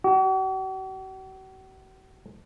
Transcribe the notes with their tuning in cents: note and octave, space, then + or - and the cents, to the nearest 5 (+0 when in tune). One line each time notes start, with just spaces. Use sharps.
F#4 +45